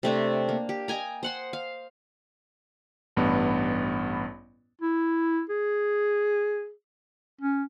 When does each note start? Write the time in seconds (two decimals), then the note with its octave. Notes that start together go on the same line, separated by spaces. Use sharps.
0.03 C3 A3 D4
0.49 A#3
0.69 G4
0.88 D#5 G5 G#5 A#5
1.23 C5 F#5 C6
1.53 F5
3.17 A1 G2 B3
4.81 E4
5.49 G#4
7.41 C#4